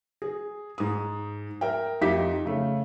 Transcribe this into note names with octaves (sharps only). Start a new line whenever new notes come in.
G#4
G#2 D#6
A#4 E5 G5
F2 D#4 G4 E5 B6
C#3 A3